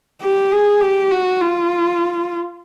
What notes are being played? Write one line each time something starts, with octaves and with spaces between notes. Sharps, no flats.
G4
G#4
G4
F#4
F4